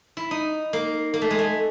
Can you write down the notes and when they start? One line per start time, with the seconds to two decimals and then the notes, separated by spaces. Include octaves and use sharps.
0.17 E4
0.31 D#4
0.73 A#3
1.14 A#3
1.22 A3
1.31 G#3
1.39 A3